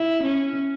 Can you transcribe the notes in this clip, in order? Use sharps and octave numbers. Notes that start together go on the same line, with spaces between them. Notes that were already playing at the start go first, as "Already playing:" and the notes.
Already playing: E4
C#4